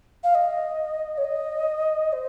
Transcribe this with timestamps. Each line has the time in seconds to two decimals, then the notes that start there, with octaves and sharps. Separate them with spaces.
0.24 F5
0.35 D#5
1.18 C#5
1.24 D#5
2.13 C5